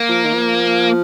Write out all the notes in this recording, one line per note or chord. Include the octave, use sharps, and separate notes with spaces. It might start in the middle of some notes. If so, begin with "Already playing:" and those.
Already playing: A#3
F3
D#3
F3